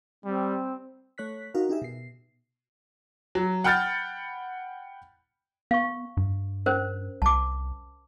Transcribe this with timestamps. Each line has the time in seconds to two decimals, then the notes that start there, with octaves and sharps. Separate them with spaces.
0.25 G3 C4
1.18 A3 C#5 F#6 B6
1.54 D#4 F#4 A#4 F5
1.69 D#4 G4 G#4 E5
1.82 B2 C7
3.35 F#3
3.64 F#5 G5 B5 F6 G6 A6
5.71 B3 F5 C#6
6.17 G2
6.66 C#4 A#4 C5
7.22 C2 A5 D6